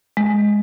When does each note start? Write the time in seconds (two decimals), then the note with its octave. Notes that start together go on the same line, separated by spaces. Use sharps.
0.17 G#3